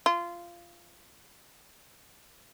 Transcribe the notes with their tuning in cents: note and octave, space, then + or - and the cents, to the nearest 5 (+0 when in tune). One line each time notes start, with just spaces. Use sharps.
F4 -15